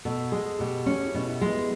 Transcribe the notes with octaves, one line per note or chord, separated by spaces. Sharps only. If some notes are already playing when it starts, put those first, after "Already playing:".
B2 A4
G#3 G#4
B2 G4
C#4 F#4
E4
B2
E4
G#3
B3